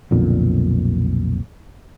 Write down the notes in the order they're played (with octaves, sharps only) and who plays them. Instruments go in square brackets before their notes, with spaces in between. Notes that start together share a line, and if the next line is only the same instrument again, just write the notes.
[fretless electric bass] B1 F2 A#2 D3